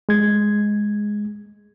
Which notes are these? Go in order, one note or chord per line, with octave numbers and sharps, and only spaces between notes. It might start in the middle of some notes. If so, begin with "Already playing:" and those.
G#3 G#6